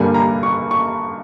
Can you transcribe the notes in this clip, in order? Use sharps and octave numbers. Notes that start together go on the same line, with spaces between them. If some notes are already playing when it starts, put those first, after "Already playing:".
Already playing: G2 D3 G3 A#3 G#5
A#5
C#6
C#6